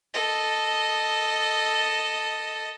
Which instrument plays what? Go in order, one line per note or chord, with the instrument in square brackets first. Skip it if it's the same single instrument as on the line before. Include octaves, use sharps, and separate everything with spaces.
[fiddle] A4 D#5